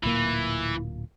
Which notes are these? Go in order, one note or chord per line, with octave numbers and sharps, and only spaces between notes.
D1 A#2 E3 A#3